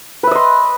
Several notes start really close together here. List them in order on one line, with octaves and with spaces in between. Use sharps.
B4 E5 D#5 C6